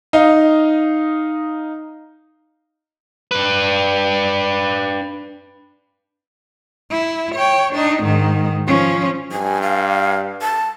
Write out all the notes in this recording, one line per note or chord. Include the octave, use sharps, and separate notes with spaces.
D#4 D#5 F5
D4 B4
E4
C#5 G5
D4 D#4
G#2 D#3
F3 C#4
G2 G#5
F5
A5